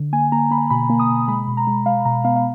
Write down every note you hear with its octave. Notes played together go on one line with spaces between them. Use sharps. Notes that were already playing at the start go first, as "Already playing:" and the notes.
Already playing: D3
A#3 G#5
A#3 A#5
A#3 B5
B2 B5
A#3
D#6
B2
G#3 B5
B2
A#5
G#3
G#3 F5
B2 A#5
B3 F5
F5